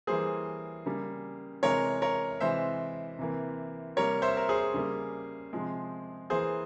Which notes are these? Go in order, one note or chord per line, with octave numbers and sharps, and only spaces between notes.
E3 G3 A#3 G#4 C5
C#3 G3 A#3
C3 E3 G#3 A#4 C#5
A#4 C#5
C3 E3 G#3 C5 E5
C3 E3 A#3
C3 G3 A#3 A#4 C#5
C5 E5
A#4
G#4 C5
C#3 G3 A#3
C3 F3 G#3
E3 A#3 G#4 C5